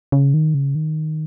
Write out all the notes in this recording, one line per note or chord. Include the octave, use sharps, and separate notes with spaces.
C#3
D#3
C#3
D#3